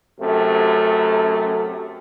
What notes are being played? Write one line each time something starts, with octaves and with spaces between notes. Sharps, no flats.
F#2 C3 A3